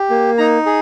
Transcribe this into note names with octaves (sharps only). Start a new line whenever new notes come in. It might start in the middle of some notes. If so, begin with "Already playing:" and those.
Already playing: G4
A#3
D#4 A#5
G#4